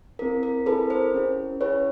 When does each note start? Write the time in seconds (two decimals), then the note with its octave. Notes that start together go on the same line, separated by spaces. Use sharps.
0.19 C4 E4 G#4 A#4
0.43 A#4
0.66 C4 E4 G#4 A4 B4
0.90 A#4 C5
1.14 C#4 E4 G#4
1.61 C#4 E4 G#4 B4 C#5